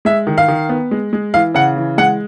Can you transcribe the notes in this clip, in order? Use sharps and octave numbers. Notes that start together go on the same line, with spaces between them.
G#3 E5
D#3
F5
D#3
B3
G#3
G#3
E3 F5
C#3 F#5
E3
G#3 F#5